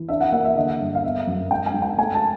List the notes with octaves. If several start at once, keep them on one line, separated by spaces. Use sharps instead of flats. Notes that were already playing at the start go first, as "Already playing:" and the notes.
Already playing: E3
D4 E5
F#5
A#3 F#5
E5
D3 D#5
G2
F5
B3 E5
F#2
G#2 G5
G#5
G#3
G5
A3 G#5
A5